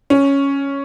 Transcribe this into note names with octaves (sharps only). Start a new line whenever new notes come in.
C#4